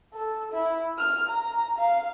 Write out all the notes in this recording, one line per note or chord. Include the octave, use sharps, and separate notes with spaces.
A4
E4
F6
A#5
F5